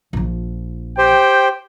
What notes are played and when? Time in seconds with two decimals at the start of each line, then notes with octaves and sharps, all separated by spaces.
0.13 A#1 F3
0.98 G4 C5 G5